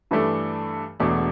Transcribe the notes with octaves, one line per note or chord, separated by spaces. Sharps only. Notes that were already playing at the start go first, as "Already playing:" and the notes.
G2 E3 A3 D4 A4
E1 E2 B2 A3 D4